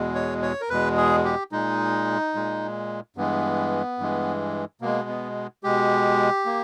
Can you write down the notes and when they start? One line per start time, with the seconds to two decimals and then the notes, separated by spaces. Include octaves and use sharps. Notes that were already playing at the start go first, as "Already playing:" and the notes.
Already playing: E2 B2 G#3
0.15 C#5
0.42 C#5
0.61 A#4
0.69 E2 B2 G#3 B4
0.97 G#4
1.24 G4
1.52 A#2 G#3 D#4
2.35 A#2 G#3
3.16 G2 E3 G#3 B3
3.99 G2 E3 G#3
4.81 B2 G#3 A#3
5.09 B3
5.64 B2 G#3 G4
6.46 A#3